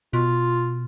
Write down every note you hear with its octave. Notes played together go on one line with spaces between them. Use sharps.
B2 F4